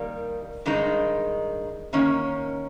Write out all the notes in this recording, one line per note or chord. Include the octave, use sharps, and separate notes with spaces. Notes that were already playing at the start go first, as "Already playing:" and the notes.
Already playing: D#3 G3 A#3
G2 D#3 G#3 D#4
D#3 A#3 C#4